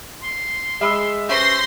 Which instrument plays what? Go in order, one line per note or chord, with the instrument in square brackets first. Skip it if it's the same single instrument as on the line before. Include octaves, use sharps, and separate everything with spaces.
[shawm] C6
[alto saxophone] G#3 [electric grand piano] E5 B5 E6
[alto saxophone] C#4 [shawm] G4 [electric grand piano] B4 C5 E5 [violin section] C6 A#6